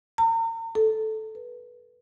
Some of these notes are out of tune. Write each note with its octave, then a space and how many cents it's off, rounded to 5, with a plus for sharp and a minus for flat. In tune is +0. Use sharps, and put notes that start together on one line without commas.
A#5 -40
A4 -10
B4 -15